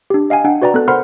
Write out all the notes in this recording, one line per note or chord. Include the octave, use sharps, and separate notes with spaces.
D4 G4
D#5 F5 G5 G#5
D4 F#5 G5
F#4 B4 D5 G5 A#5
B3 A4 F#6
A#4 C5 F#5 B5 C6 F6